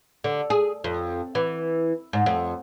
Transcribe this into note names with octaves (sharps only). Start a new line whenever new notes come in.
D3
G#4
F2
E3
G#2
F2